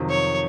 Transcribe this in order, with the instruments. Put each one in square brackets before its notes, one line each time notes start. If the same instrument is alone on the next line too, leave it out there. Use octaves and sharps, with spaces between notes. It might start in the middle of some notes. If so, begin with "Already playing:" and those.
Already playing: [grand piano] F2 C3 D#3 F#3
[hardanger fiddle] C#5